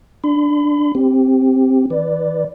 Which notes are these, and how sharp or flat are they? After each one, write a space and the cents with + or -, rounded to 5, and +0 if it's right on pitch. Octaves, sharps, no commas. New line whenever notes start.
D4 +0 B5 +45
C4 +0 G4 +0
E3 -40 B4 +0 D5 +0